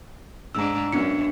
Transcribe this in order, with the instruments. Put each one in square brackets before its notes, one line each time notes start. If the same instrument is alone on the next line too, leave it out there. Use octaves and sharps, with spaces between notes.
[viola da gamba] G#2 D4 [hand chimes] A#5 E6
[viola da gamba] F#2 [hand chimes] B3 D4 C#7